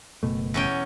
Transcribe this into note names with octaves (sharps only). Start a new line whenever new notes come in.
F#1 B2 A3
E2 C#4 G5